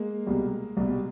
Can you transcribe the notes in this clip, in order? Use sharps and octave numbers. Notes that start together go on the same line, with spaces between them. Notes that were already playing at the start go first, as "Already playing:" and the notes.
Already playing: G#3 A#3
C2 B2 G3
C2 B2 G3